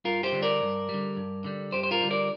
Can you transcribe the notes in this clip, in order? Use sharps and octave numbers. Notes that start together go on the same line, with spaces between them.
G2 F4 A#4
G4 C5
D3 G3
A#4 D5
G2
D3 G3
G2
D3 G3
G2 G4 C5
C5
F4 A#4
D3 G3
A#4 D5